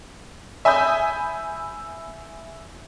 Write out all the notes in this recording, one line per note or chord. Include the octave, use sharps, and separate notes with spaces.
E5 G#5 B5 D#6 G6